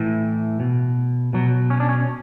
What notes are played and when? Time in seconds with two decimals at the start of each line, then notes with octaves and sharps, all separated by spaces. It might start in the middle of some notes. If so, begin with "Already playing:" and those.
Already playing: A2 E3
0.60 B2
1.33 B2 F#3
1.70 C#4
1.80 D4
1.89 C#4